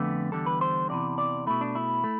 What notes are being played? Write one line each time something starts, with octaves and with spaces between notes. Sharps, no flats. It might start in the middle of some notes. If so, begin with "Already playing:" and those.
Already playing: F2 D3 A3 B3
E2 D3 G3 A4
B4
C5
E2 C3 E3 D5
D5
B2 A3 E4
D4
E4
A3